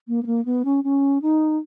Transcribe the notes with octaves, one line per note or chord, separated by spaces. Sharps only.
A#3
B3
A#3
B3
C#4
C#4
D#4